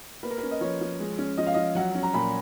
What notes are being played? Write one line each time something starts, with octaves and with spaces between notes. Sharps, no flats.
A#3 B4
A#4
C#4 B4
D#5
F3 C#5
F3
G#3
C#4
F3 D#5
F5
F3 D#5
F#3 F#5
C#4
A#5
A#2 B5